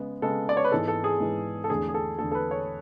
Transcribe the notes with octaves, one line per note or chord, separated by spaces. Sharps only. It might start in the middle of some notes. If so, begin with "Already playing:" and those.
Already playing: C#3 G#3 B3
C#3 G#3 B3 A4
D5
C#5
B4
G#2 E3 G#3 B3 A4
A4
G#4
G#2 E3 G#3 B3
A4
E2 D3 A3 G#4
G#4
A4
E2 D3 A3 A4
A4
B4
C#5